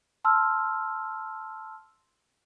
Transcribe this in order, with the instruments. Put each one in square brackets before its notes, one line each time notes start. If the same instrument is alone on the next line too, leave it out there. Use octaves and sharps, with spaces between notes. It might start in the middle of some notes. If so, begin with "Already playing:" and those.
[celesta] A5 C6 E6 F6